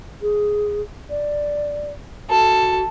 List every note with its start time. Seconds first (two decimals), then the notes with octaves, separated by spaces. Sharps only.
0.22 G#4
1.10 D5
2.30 F#4 A4